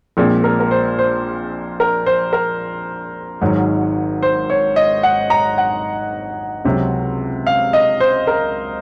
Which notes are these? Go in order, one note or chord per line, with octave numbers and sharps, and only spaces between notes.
A#1 A#2 G#3 C4
A#4
A#4
C5
C5
A#4
C5
A#4
G#1 G#2 D#3 F#3
C5
C#5
D#5
F#5
A#5
F#5
C#2 C3 F#3
F5
D#5
C5
A#4